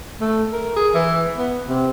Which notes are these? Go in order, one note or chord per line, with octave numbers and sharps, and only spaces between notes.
A3
A#4
G#4
E3
B3
C3